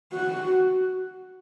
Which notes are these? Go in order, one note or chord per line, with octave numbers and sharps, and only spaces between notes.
F#4